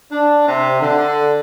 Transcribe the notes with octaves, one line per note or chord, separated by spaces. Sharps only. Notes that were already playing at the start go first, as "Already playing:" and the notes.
D4
C3
D3